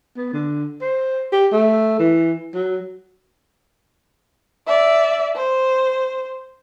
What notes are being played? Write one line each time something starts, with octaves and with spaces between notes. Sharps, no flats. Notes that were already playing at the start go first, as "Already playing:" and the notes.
B3
D3
C5
G4
A3
E3
F#3
D5 E5
C5